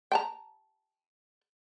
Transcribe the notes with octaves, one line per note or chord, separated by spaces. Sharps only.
G5 A5 A#5